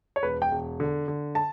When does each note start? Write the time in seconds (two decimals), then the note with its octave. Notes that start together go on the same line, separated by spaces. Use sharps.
0.16 C#5
0.23 E1 B4
0.42 G5
0.51 E1
0.80 D3
1.08 D3
1.35 A5